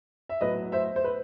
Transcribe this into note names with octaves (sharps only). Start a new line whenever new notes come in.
E5
A2 F#3 B3 B4 D#5
C5 E5
C5
B4